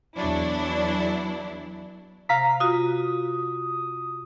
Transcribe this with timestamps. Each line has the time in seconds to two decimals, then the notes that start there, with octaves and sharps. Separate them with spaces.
0.16 E2 F#3 D4 E4
2.29 C3 F5 A#5 B6
2.60 F4 F#4 D#6